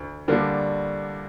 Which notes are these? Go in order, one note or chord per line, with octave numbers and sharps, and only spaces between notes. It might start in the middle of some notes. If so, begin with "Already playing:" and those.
Already playing: D2
D3 G3 A#3 D4